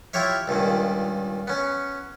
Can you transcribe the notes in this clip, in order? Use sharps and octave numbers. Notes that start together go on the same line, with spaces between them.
E4 F4 G4 C#5 E5
C#2 G2 A#2 D#3
B3 C#4